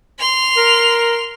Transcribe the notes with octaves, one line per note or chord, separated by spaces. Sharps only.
C6 F7
A#4